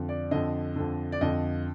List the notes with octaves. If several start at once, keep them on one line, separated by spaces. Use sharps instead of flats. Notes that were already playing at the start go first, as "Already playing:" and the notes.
Already playing: F2 D3
D5
F2 D3 D#5
F2 D3
D5
F2 D3 D#5